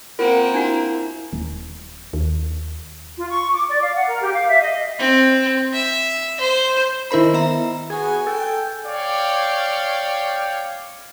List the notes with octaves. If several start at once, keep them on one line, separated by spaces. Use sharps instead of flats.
A#3 C4 F4 A#4 F#5
D4 E4 F#4 A#5
D#1
D#2
F4
C#6
D6
D5
F5
F#5
A#4
G4
F5
E5
D#5
C4
E5
C5
D#3 E4 A#4 C5 B5
B3 E5 A#5
B3 F#4 G#4 G#5
A4 G5
C#5 D5 F5 G5